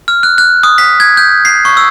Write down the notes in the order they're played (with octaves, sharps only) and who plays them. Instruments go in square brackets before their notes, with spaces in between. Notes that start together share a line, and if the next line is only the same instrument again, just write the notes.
[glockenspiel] F6
F#6
F#6
D#6
B6
G#6
G6
C7
C#6
E6